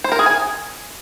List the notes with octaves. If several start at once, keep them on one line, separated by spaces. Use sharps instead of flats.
C5
A#4
G#4
G#5